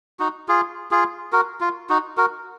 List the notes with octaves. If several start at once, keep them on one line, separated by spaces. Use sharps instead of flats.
D#4 F#4
F4 G#4
F4 G#4
F#4 A#4
F4
D#4 F#4
F#4 A#4